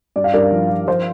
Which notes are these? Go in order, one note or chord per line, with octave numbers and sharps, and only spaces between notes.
G2 D5
F5
G2 A#4 D5
F3
F3
F3 C5 F5